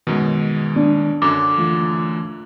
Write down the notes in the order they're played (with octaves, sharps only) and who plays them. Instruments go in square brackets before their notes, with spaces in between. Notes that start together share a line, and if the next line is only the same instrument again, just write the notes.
[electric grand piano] F#2 B2 [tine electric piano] D#3 G#3
[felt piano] D4
[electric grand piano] F#2 D3 [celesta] D6
[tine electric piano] E3 A3 F4